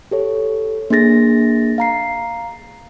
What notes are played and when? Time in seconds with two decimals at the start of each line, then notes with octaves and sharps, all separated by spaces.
0.11 G4 A4 C#5
0.90 A#3 D4 G#4 A6 A#6
1.78 F5 A#5 C7